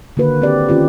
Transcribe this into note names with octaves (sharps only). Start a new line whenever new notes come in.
D3 D#3 A#3 F#4 B4
C4 F#4 G4 D5
D#3 C#4 F4 G4